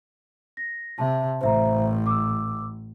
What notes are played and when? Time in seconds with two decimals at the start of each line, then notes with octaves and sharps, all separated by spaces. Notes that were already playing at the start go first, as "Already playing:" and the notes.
0.57 A#6
0.98 C3 E5 A5
1.41 A1 C5 E5 A#5
2.06 D6 E6